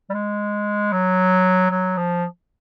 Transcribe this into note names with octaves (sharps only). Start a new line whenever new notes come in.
G3
G#3
F#3
F#3
F3